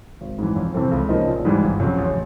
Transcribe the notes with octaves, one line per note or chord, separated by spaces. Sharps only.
G#1
G#2 E3
F2
C3 E3 A3 C4
C#2
C#3 F3 A#3 D#4
A#1
G#2 E3 G3
G1
F2 C#3 F#3
A1